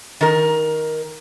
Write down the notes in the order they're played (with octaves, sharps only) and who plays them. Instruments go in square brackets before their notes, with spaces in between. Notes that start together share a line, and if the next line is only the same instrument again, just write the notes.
[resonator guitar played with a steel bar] D#3 A#4